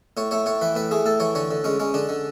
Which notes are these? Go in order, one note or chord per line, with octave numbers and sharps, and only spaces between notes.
A2 C#5
A3 C#5
A2 C#5
E3 B4
A2 B4
A3 G#4
A2 A4
E3 C#5
D3 C#5
D3
G#3 C#4
G#3 C#4
D3 D4
D3